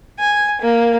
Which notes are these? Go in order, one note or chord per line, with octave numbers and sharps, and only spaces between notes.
G#5
A#3